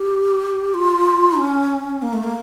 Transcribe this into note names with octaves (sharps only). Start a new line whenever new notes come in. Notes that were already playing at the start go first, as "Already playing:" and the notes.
Already playing: G4
F4
C#4
A#3
A3
A#3